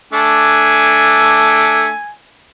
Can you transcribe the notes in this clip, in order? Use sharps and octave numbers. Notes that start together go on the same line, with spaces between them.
A3 D4 G#5